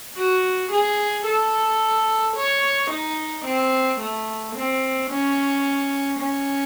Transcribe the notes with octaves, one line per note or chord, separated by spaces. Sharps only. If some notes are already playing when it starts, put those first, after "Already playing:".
F#4
G#4
A4
C#5
D#4
C4
A3
C4
C#4
C#4